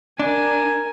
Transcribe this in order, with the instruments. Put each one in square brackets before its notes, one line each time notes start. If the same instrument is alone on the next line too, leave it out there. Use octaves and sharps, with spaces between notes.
[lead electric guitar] D4 [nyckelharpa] A#4 G#5